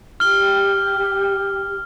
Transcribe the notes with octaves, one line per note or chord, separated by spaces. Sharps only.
G4 F6 G7